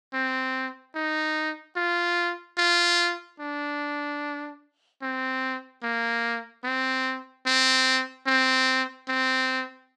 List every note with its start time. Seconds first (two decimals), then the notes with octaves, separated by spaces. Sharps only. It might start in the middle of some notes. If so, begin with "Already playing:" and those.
0.13 C4
0.95 D#4
1.76 F4
2.58 F4
3.39 D4
5.02 C4
5.83 A#3
6.64 C4
7.46 C4
8.27 C4
9.08 C4